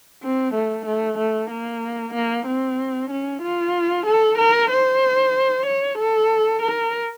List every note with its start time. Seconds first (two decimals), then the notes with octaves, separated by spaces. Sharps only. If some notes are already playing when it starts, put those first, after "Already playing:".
0.23 C4
0.54 A3
0.86 A3
1.18 A3
1.50 A#3
2.14 A#3
2.46 C4
3.10 C#4
3.42 F4
4.06 A4
4.38 A#4
4.70 C5
5.66 C#5
5.99 A4
6.62 A#4